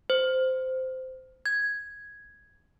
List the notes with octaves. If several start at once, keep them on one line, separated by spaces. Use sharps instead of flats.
C5
G#6